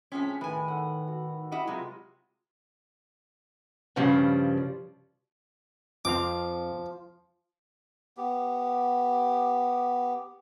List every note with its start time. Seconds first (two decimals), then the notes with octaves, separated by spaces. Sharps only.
0.12 A2 F3 C4 C#4 G#4 B6
0.41 A2 D#3 B4 G#5
0.68 A4 C#5 F#5
1.08 F#4
1.52 G3 E4 D#5 F#5
1.67 C3 F#3 G#3 F4
3.96 G2 C#3 F3 G3
6.05 F2 F3 C4 C5 F5 D6
8.17 B3 G4